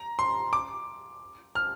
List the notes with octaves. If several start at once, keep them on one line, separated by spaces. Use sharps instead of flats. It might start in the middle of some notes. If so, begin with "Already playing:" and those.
Already playing: A#5
C6
D6
F6